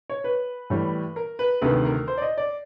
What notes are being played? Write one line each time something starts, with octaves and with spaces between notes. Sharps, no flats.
C#5
B4
A2 E3 G3
A#4
B4
D2 C3 D#3 B4
A#4
C5
D5
D#5
D5